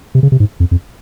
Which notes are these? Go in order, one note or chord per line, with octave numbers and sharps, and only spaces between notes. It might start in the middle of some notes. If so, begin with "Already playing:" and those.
C3
C#3
C3
G#2
F2
F2